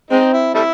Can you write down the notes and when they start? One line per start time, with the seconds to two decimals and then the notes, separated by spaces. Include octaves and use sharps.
0.11 G#3 C4 D#4
0.33 E4
0.54 G3 A3 E4